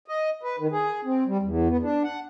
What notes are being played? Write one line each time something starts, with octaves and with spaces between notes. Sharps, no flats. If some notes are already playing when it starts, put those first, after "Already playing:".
D#5
B4
D#3
G#4
C4
G3
E2
B3
D4
F#5